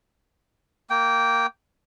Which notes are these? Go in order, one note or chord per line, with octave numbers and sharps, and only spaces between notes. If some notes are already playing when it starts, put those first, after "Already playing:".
A#3 G5